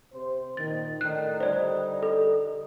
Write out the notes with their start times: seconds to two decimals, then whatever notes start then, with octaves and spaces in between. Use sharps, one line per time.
0.12 C3 C5
0.57 A#2 D#3 A6
1.01 A2 D3 D#3 F#6
1.40 D3 G3 D#4 C5 D5
2.03 A4